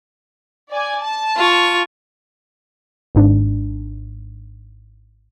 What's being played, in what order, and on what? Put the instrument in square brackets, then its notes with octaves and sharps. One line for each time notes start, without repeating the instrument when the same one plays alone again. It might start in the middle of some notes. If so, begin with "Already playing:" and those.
[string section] D5 G#5
A5
[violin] F4 C#6
[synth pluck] G#1 G#2 D4